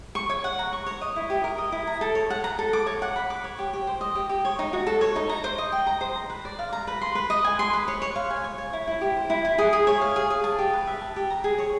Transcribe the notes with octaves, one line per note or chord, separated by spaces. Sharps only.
C#6
C#5
F#5
A#5
C#6
C#5
D#5
E4
G4
A#4
D#5
E4
A#5
A4
C#5
F#5
A#5
A4
D6
C#5
F#5
B5
D6
C#5
G4
G4
C5
D#5
G4
G4
C#5
D#4
F#4
A4
C#5
D#4
A#5
C5
D#5
G5
A#5
C5
A#5
B4
D5
F5
A#5
B4
C6
B4
D#5
G#5
C6
B4
C#5
C#5
F5
G#5
C#5
C#5
E4
E4
G4
C5
E4
E4
G#4
G#4
C#5
F5
G#4
G#4
A5
G4
B4
E5
A5
G4
A#5
G#4
C#5